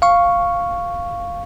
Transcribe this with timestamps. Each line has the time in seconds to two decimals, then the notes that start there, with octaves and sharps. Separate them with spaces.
0.02 F5 C#6